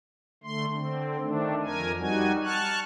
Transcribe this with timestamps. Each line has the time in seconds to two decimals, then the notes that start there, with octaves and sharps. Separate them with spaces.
0.44 D3 A3 C6
0.72 D3 C4
1.21 D#3 A3 D4
1.62 F2 A#4 G#5
1.98 G3 D#4 F#4 G#5
2.44 A5 C#6 F6 F#6